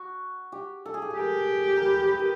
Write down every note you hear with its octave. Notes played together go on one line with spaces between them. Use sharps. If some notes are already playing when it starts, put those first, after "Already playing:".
Already playing: F#4
G4
A4
G#4
G4
G#4
G4 A#4
A#4
B4
B4
A#4